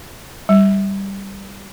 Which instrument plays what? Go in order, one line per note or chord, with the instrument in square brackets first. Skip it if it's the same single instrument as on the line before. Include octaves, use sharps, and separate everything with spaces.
[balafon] G3